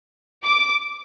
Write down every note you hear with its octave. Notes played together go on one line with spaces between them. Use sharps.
D6